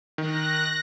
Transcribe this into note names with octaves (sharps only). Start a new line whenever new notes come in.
D#3 F#6 A#6